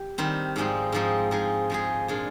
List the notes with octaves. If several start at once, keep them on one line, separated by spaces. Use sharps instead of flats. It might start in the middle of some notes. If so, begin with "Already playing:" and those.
Already playing: G4
D#3 G3 C4
G#2 F3 G#3 C4 D#4
G#2 F3 G#3 C4 D#4
F3 G#3 D#4 G#4
F3 G#3 D#4 G#4
A#2 G#3 D4 G#4